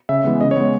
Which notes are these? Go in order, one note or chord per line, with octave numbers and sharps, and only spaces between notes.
C#3 E5
E3 G#3 B3
C#3 D#5
C#5
G#3 B3